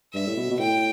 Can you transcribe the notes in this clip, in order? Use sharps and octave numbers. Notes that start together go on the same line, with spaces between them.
G2 E5
A2
B2
B2
A2 G5